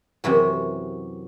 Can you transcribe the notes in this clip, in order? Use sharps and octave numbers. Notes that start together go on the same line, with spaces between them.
F#2 C3 E3 F#3